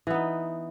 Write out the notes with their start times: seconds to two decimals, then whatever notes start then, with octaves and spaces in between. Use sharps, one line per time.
0.07 E3
0.10 B3
0.14 D#4